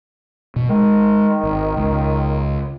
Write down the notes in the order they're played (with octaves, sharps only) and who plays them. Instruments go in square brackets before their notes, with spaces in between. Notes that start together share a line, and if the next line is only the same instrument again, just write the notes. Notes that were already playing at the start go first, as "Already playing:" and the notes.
[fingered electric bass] B2
[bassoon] D#3 [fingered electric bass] G#3
[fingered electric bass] G#1
C#2